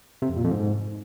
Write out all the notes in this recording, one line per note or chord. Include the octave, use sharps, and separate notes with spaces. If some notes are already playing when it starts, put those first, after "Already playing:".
C3
F2
A#2
F2
G#2